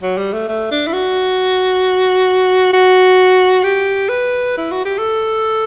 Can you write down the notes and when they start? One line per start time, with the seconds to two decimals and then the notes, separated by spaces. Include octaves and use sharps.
0.03 F#3
0.18 G3
0.33 A3
0.48 A3
0.71 D4
0.87 E4
0.93 F#4
2.73 F#4
3.64 G4
4.09 B4
4.58 E4
4.72 F#4
4.85 G4
4.99 A4